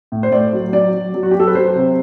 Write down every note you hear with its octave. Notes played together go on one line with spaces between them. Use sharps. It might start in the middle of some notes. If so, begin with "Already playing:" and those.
A2
C5
A2 D5
F#3
F#3 D5
F#3
F#3
F#4
G4
F#3
A4
B4
F#3 C5
C3